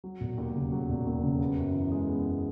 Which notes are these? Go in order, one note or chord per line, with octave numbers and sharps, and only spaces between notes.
F#3
E1
D#2
C#3
F#3
E1
D#2
C#3
B3
F#2
E3
G#3
B3
F#2